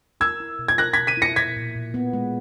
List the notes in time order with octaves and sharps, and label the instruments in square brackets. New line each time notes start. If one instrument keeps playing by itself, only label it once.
[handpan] A#4 [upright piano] E6 G#6
[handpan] E4
B2
[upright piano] G#6
[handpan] A#4 [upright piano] F#6 A#6
[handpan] B2 [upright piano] G#6 B6
[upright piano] B6 D#7
[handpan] E4 [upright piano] A#6 C#7
[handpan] A#2 [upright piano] G#6 B6
[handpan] A#2
A#2
B3
G#3